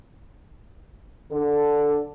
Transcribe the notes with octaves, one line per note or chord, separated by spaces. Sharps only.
D3 A4